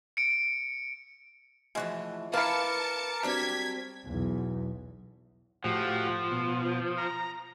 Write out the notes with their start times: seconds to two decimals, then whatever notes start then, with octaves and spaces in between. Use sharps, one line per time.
0.17 C#7 D7
1.75 A2 E3 F3 G#3 F#4
2.33 E4 A#4 B4 F5 A5 D6 C#7
3.23 F#3 G3 C4 D4 G#6 B6
4.05 B1 E2
5.64 A2 F3 F#4 G4
6.31 B2
6.98 A#5